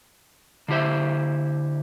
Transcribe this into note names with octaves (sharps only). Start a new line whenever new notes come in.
D3 E4 G4 C5 E5